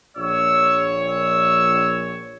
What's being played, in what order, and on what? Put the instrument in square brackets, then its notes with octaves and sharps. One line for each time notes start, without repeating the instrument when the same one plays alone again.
[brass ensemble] A#1 C#5 [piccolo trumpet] E6
[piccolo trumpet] E6